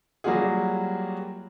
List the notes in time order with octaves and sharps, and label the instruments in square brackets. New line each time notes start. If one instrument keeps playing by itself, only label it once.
[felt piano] F#3 G3 A#3 F4 F#4 G#4